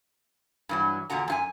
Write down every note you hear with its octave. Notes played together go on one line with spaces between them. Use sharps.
G2 E3 F#3
E2 A#2 D3 F#4 A#5
F#2 F4 G#5